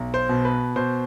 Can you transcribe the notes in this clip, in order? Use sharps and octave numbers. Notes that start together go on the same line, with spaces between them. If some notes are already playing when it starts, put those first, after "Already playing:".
Already playing: B1
C5
B2
B4
B2 C5